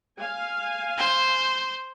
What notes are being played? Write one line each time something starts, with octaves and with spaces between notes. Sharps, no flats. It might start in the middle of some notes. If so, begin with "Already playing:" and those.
F5 G#5
C5